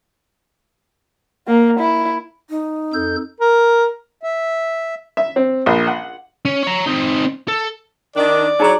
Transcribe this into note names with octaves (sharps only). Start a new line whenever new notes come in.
A#3
E4
D#4
F2 A4 G6
A#4
E5
E5
C4
A#1
F#5
C#4
C#5 A#5
C4 D#4
A4
D#3 D4 D5
F#3 D#4 G#4 C#5 A#5